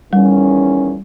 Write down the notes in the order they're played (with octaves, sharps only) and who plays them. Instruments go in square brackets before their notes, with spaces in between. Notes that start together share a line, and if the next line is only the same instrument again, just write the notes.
[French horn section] E2 D#3 C#4 [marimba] G3